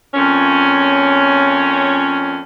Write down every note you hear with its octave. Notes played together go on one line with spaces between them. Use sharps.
F2 A#2 C#4